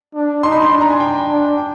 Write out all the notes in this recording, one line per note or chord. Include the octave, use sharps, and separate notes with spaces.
D4
D#4 C6
B5
B5
D4 C6
A#5
G#5
G5
D4
G5